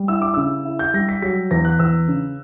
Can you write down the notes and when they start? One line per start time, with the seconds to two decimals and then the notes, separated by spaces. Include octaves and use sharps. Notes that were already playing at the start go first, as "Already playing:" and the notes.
Already playing: G3
0.08 E4 E6
0.22 D6
0.34 C#3 E6
0.65 E4
0.79 G6
0.94 G3 A#6
1.09 B6
1.22 F#3 B6
1.51 E2 A#6
1.65 F#6
1.79 E2 E6
2.08 C#3